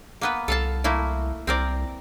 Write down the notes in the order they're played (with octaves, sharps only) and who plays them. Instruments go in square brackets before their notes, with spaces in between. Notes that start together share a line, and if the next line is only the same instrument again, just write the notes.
[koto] A#3 B3 B4
[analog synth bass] C2 [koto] A4 F5 A5
[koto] A3 A#3 E4
[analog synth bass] C2 [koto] C4 A#4 D5